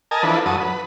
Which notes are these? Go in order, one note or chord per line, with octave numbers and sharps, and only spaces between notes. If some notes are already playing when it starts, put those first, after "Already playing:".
A#4 D#5 G#5 A5
E3 F3 D4 A4 B4
F#2 F#3 A5 D#6
B4